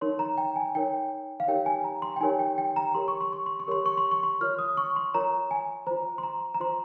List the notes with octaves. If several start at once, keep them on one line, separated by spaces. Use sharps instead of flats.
D#4 A#4 C#5 C6
A#5
G5
G#5
D#4 A#4 C#5 G5
F5
D#4 G4 A#4 C#5 G5
G#5
A#5
C6
G5
D#4 G4 A#4 C#5 G#5
G5
G5
A#5
G4 A#4 C#5 C6
C#6
C6
C#6
C6
C#6
G4 A#4 C#5 C6
C#6
C6
C#6
C6
F4 A#4 C#5 F6
D#6
C#6
C6
F4 A#4 C#5 A#5
G#5
F4 C5 A#5
C6
A#5
A#5
F4 C5 C6